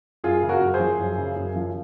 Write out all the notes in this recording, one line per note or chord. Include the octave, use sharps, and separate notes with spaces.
F#2 F4 G#4
C#3
F#4 A#4
F#2
G#4 C5
F3
F#2
C#3
F#2
F3